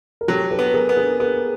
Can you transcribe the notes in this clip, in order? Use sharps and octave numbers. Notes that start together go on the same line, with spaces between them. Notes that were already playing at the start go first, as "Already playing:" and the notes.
A#4
F#3 G4 A4
A4 B4
B3
G#4 A#4
B3
G#4 A#4
B3 G#4 A#4